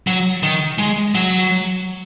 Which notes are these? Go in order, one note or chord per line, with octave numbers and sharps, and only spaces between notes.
F#3
D#3
G#3
F#3